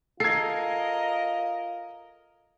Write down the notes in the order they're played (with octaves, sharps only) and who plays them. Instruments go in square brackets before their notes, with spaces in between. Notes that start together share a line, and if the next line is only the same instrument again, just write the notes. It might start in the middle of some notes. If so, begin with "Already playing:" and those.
[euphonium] F4 [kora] A4 [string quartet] A#4 D#5 [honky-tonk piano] G#6 C7